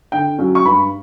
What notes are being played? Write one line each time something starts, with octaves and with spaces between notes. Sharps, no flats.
D3 G5
F#3 C#4
C#6
G2 B5